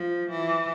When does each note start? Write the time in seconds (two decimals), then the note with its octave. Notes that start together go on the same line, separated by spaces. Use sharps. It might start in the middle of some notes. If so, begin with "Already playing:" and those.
Already playing: F3
0.30 E3